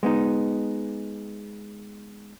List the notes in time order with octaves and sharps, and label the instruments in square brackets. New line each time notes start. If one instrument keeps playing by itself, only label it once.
[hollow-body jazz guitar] G#3 B3 D#4